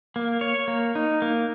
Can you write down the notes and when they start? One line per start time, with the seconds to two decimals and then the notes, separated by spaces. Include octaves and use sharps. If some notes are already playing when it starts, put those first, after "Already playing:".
0.16 A#3
0.41 C#5
0.68 A#3
0.95 D#4
1.22 A#3